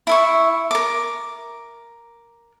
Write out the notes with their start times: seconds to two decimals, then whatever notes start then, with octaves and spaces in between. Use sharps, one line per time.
0.07 E4 E5 C#6
0.71 A#4 D6